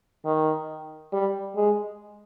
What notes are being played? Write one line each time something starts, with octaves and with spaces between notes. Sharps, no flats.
D#3
G3
G#3